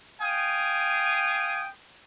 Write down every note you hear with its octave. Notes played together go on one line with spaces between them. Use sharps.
F5 G5 G#5 D#6